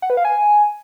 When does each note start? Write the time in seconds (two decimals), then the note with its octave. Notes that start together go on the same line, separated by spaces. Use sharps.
0.02 F#5
0.10 B4
0.17 F5
0.25 G#5